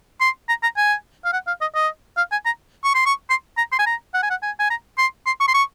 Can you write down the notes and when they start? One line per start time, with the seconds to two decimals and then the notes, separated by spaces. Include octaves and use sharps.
0.21 C6
0.49 A#5
0.63 A#5
0.77 G#5
1.25 F5
1.33 F#5
1.47 F5
1.61 D#5
1.75 D#5
2.17 F5
2.32 G#5
2.45 A#5
2.84 C#6
2.94 C6
3.06 C#6
3.30 C6
3.57 A#5
3.72 C6
3.79 G#5
3.86 A#5
4.14 F#5
4.23 G#5
4.30 F#5
4.42 G#5
4.59 G#5
4.70 A#5
4.98 C6
5.26 C6
5.40 C#6
5.48 C6
5.54 C#6